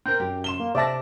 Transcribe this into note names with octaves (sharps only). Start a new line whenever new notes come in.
C4 A#4 G6
F#2 G4
C6 E7 G7
A#3
C3 D5 E5 A5 D6 A#6